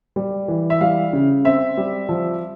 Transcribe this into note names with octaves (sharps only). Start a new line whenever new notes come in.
G3
E3
E5
G3 F5
C#3
C4 E5
G3
F3